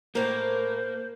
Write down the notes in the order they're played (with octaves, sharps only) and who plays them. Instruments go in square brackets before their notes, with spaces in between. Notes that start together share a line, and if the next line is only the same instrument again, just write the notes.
[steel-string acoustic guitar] A2 A#4 [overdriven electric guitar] A#3 [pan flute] C5